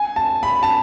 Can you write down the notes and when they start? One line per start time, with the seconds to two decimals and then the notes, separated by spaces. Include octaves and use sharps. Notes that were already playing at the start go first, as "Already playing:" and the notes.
Already playing: G#5
0.16 A5
0.43 B5
0.63 A5